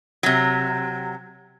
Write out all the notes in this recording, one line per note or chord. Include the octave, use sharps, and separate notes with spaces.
C3 F#3